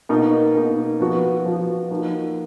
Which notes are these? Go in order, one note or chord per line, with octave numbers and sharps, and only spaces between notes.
B2 A#3 D#4
B2 A#3 D#4
F3 B3 F#4
F3 B3 F#4
F3 A#3 D#4 F#4